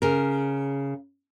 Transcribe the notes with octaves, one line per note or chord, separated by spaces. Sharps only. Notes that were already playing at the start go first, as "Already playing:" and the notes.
C#3 A#4